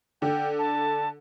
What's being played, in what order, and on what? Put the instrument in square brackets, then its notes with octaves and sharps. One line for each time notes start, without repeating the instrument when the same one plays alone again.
[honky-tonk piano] D3 [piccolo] G5
[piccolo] A5